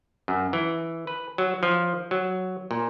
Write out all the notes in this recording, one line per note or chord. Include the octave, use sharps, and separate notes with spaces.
F#2
E3
B4
F#3
F3
F#3
A#2